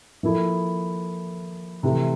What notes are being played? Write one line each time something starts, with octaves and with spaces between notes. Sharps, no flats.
F3 A#3 E4 A4
C3 E3 A3